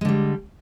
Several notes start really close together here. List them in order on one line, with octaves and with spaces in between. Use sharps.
G#3 D3 G3